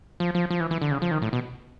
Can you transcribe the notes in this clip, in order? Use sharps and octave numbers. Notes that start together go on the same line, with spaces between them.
F3
F3
F3
E3
E3
D3
C#3
F3
D#3
A2
B2